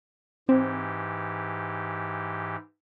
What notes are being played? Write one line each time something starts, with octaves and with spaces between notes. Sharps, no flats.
G#2 E3 C4 G4